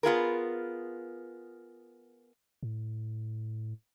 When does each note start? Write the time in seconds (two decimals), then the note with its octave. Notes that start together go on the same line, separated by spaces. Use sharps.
0.03 B3 F4 G#4 A#4
2.63 A2